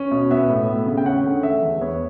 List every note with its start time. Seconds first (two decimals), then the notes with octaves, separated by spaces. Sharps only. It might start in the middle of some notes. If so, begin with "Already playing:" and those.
Already playing: C#4
0.11 B2
0.31 B3 E5
0.49 A2
0.68 A3
0.86 C#3
0.97 G5
1.06 C#4 F#5
1.24 D3
1.43 A3 E5
1.62 E2
1.81 B3 C#5